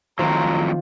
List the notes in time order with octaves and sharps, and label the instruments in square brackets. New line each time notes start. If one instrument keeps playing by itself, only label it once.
[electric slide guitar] F2 A2 F#3 [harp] D#3 F4 C5 [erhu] A#5